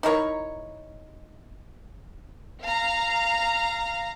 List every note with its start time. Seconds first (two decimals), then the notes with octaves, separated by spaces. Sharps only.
0.03 D#4 E4 A#4 C#5
2.64 F5 A#5